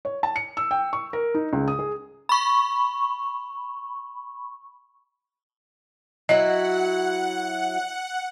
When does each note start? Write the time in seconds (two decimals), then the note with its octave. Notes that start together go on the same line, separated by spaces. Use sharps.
0.05 C#5
0.23 A5
0.36 C#7
0.57 E6
0.71 G5
0.93 C#6
1.13 A#4
1.35 D#4
1.53 C#2
1.68 D#6
1.79 G#4
2.29 B5 C#6
6.29 F#3 E4 F#4 D#5 F#5